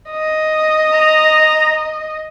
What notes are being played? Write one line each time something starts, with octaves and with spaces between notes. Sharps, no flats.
D#5
A#5